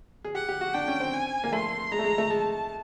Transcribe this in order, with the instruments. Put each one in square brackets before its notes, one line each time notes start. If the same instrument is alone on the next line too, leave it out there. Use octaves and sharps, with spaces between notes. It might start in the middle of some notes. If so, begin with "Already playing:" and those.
[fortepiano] G#4
[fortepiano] G4 [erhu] F#5
[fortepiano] G4
F#4
[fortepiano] D4 [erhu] G5
[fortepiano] C#4
C4
[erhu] G#5
[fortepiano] A#3
[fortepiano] A3 [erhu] C6
[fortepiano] G#3 [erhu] A#5
[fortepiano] A3
G#3
A3
[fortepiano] G#3 [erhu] A5